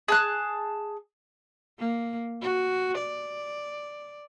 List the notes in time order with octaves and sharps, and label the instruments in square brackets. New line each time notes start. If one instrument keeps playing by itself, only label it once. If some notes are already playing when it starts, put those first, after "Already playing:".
[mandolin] G#4 A5 F#6
[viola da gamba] A#3
F#4
D5